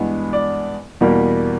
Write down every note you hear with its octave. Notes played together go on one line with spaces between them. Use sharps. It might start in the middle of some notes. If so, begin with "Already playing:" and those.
Already playing: G2 E3 G#3 B3
D5
E2 B2 G3 A#3